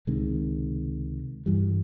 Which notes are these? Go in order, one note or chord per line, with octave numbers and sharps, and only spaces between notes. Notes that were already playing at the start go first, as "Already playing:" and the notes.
C#2 C3 D#3 G#3
G2 E3 G3